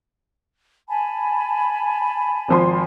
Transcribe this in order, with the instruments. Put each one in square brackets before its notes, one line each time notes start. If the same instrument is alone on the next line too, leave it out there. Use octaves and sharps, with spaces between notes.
[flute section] G#5 A5 B5
[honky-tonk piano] G#1 F3 C6